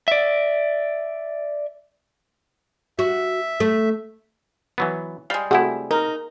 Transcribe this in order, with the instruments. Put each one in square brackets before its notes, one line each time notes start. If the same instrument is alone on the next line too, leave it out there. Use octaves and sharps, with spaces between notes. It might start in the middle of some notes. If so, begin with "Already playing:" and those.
[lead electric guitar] D5 E5
[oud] F#4 [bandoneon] E5
[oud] A3
[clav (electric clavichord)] E3 F#3 B3
[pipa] G3 G#3 [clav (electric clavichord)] F5
[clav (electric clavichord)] C3 E4 [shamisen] A3 F#4 [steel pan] G#4
[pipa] D#4 [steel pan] A#4